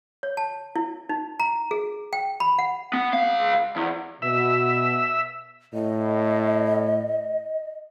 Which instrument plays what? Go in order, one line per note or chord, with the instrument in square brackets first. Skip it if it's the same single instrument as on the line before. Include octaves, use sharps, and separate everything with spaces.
[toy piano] C#5
A5
E4
D#4
A#5
G#4
G5
B5
F#5
[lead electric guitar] B3
C#2 F5
E2
[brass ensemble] B2 [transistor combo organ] E5
[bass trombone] A2 [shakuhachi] D#5